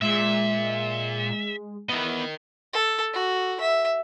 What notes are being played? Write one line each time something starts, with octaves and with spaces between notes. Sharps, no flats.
A#2 G#3 E5
B3 E4 A#4 D#5
A4
F#4
E5